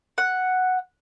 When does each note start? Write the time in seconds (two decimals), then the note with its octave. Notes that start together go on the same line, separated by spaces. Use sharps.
0.18 F#5